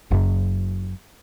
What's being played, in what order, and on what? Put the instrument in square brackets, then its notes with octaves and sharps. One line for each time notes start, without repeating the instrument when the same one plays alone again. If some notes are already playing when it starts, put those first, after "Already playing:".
[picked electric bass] F#1 F#2